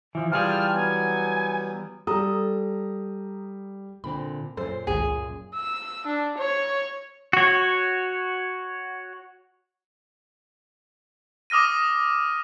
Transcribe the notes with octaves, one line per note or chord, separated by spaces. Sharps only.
E3 F3
E3 G3 F4 G#4 G5 A5 F6
F#3 B3 G#5
G3 A4 A#5 D#6
A#2 D3 C4 B5
F#2 A#2 A4 C5
G#1 C#2 G2 G#4
E6
D4
C#5
F#4 C#5
D6 D#6 F6 A#6 D#7